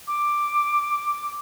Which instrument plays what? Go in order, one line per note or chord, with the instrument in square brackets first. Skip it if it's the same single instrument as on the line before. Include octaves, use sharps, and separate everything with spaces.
[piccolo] D6